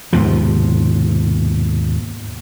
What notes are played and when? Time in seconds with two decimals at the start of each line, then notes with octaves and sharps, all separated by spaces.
0.13 D#2 G#2 B2 F3